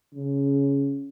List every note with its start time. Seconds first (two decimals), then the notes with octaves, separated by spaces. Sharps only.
0.14 C#3